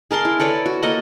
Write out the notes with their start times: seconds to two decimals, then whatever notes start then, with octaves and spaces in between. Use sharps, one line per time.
0.11 G#4 A#4 A5 C6
0.25 E4
0.40 A4 B4 C#5 D5
0.66 F#4
0.83 A#3 A4 D#5 F#5